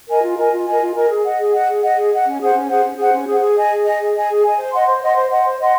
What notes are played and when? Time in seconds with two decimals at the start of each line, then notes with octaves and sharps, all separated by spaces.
0.08 A#4 D#5 G#5
0.22 F4
0.38 A#4 D#5 G#5
0.52 F4
0.66 A#4 D#5 G#5
0.81 F4
0.95 A#4 D#5 G#5
1.09 G#4
1.24 D#5 F#5
1.39 G#4
1.53 D#5 F#5
1.67 G#4
1.82 D#5 F#5
1.96 G#4
2.12 D#5 F#5
2.26 C#4
2.40 G#4 C5 F#5
2.54 C#4
2.68 G#4 C5 F#5
2.84 C#4
2.97 G#4 C5 F#5
3.13 C#4
3.27 G#4 C5 F#5
3.41 G#4
3.56 D#5 G#5
3.71 G#4
3.84 D#5 G#5
3.99 G#4
4.14 D#5 G#5
4.29 G#4
4.43 D#5 G#5
4.57 C5
4.72 D#5 F#5 C6
4.86 C5
5.02 D#5 F#5 C6
5.16 C5
5.30 D#5 F#5 C6
5.45 C5
5.60 D#5 F#5 C6